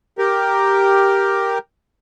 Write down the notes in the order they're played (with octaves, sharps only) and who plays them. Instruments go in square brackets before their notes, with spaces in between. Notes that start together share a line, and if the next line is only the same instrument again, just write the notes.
[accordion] G4 A#4